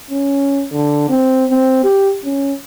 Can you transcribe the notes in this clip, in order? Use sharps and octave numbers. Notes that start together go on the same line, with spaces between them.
C#4
D3
C4
C4
G4
C#4